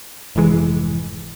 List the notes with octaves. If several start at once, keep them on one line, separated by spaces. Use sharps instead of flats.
F1 G#2 E3 G#3